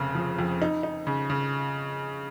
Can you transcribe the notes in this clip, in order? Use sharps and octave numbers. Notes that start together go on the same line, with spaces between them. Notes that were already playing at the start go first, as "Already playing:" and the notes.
Already playing: F1 C#3
F3
F2
D#4
D#4
C#3
C#3